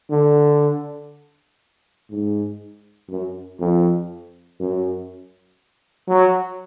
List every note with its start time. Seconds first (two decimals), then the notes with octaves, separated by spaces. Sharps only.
0.10 D3
2.10 G#2
3.09 F#2
3.59 F2
4.60 F#2
6.08 F#3